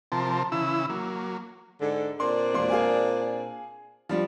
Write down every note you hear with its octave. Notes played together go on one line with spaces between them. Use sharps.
C3 F3 A#4 C5 A5
C#3 E3 E4 E6
F#3 A#3
G#2 D3
A#2 C4 D4 C6
E1 A#3 C6
G#4 F5 G#5
F3 G3 D4